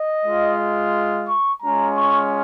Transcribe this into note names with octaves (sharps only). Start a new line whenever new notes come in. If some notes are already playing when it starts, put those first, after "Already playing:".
Already playing: D#5
G#3 F4
C#6
G#3 C#4 F4 A#5
C#6